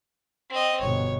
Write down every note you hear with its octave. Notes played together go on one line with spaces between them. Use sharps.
C4 D#5
G1 B2 C#5